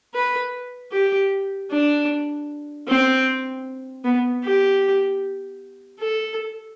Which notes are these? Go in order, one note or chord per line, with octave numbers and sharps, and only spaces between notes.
B4
G4
D4
C4
B3
G4
A4